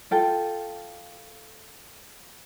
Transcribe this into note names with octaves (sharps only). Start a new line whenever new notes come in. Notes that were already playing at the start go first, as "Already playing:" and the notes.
F4 A4 G5